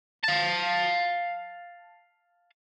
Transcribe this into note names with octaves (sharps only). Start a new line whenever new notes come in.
F5 A5